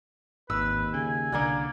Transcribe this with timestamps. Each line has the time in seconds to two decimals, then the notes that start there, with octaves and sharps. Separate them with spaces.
0.50 G#1 D#2 B4 E6
0.94 C#3 G#5
1.32 C2 D3 A#3 D5 F#5